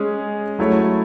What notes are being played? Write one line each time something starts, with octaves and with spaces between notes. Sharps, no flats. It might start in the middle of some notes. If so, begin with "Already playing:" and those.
Already playing: G#3 C#4 G#4
F#3 A3 E4 A4 C#5